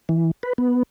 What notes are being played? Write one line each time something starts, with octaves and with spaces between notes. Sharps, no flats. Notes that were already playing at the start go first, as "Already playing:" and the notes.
E3
B4
B3